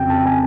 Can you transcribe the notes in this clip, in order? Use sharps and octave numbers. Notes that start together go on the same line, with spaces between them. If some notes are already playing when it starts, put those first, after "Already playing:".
Already playing: F2 C#3 F#3 G5
A5
G#5